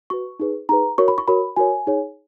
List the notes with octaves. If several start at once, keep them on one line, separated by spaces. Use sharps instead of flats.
F#4 B4 C#6
D#4 G#4 B4
D#4 G#4 B4 A#5
F#4 A#4 C#5 C#6
B5
C#6
F#4 A#4 C#5 B5
F#4 A#4 C#5 G#5
D#4 G#4 C#5